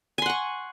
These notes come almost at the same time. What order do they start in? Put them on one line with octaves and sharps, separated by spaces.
G#5 C6 F#5 C#6